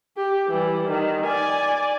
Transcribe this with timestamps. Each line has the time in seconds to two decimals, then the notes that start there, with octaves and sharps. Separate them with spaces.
0.17 G4
0.49 E3 G3
0.89 D#3
1.26 D5 G#5